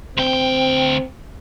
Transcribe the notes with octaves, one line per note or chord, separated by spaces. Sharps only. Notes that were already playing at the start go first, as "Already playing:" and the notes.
D2 C4 G5